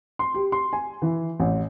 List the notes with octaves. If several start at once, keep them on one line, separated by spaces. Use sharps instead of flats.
C6
G4
C6
G#5
E3
A1